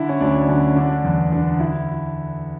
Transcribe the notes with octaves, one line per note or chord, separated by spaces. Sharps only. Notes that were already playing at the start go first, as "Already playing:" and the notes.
Already playing: D3 E4
C#4
D2 D4
D3 C#4
D3 D4
E2
D3
E4